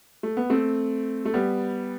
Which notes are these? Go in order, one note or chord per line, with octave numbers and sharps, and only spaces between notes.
A3
B3
A3 C4
A3
G3 B3